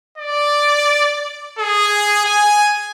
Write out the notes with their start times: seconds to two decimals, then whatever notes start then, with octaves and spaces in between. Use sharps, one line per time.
0.18 D5
1.58 G#4
2.25 G#5